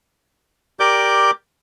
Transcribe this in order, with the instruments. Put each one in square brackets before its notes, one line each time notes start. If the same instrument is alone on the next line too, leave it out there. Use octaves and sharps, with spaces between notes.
[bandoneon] G4 A#4 D5 D6 G6